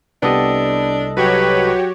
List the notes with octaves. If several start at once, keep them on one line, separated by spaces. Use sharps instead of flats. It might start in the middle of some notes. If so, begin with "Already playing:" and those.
C2 B3 D4 G4 A4 D#5
F#3 F#4 G4 B4 C#5